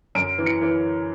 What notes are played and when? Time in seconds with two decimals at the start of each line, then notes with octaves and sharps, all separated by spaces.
0.15 F#2 D7
0.38 E3
0.46 C#7
0.61 E3